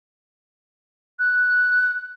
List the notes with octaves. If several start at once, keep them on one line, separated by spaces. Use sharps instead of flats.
F#6